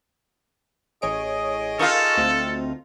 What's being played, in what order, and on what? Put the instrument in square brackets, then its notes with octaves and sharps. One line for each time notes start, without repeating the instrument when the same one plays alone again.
[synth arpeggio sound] A1 C#5 D7 [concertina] G#4 D#5
[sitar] D#4 F4 [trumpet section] A4 [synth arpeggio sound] A#4 F5 C#6
[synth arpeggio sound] D2 A3 C4